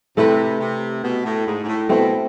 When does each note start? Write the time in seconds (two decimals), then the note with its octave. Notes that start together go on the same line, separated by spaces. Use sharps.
0.17 C3 A3 E4 B4
0.60 C3
1.03 B2
1.25 A2
1.46 G#2
1.63 G#2
1.68 A2
1.89 B2 A3 C4 E4